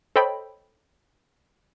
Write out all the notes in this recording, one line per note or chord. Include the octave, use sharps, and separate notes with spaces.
A4 C5 C#5 D#5 G5 B5